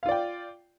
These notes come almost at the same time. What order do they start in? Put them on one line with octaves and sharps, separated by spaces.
F5 F4 D5 G5